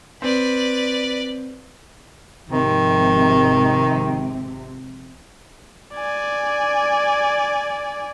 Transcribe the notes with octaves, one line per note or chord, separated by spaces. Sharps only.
C4 B4 D5
G#1 C3 D#3 F3
D5 G#5